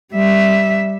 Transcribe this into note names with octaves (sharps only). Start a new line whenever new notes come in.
G3 E5